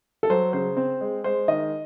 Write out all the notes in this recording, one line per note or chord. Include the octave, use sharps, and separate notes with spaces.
A4
F#3 C5
C#3 C5
C4
G#3
G#3 C5
D#3 D#5